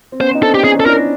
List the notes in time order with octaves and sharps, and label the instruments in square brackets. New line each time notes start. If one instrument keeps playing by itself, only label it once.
[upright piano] C4
[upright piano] B3 C#4 [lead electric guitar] C5
[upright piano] D#4
[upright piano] C4 D4 [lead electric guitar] A4
[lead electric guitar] G4
[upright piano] C#4 D#4 [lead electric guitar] G#4
[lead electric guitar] A4
[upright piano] D4 E4 [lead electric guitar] A#4